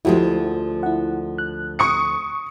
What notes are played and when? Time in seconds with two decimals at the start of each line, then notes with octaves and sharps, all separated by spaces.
0.05 D2 F3 G#3 E4 F#4 G4
0.83 E4 F#5
1.38 F#6
1.79 C#6 D#6 C#7